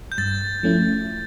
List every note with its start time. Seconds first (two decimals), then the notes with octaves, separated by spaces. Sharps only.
0.12 G6
0.18 G2 A6
0.63 F3 A3 C#4 E4